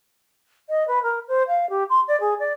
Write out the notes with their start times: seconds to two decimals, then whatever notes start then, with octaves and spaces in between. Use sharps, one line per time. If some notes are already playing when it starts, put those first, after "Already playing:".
0.69 D#5
0.87 B4
1.03 A#4
1.28 C5
1.48 F5
1.69 G4
1.89 C6
2.08 D5
2.20 G#4
2.39 D5